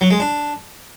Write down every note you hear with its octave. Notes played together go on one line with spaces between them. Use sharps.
F#3
G#3
D4